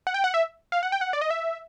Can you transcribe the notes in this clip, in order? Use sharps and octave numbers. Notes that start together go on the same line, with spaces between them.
F#5
G5
F#5
E5
F5
F#5
G5
F#5
D5
D#5
E5